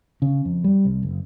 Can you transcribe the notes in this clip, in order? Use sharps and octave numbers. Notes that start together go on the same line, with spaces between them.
C#3
F2
G3
C2
F#1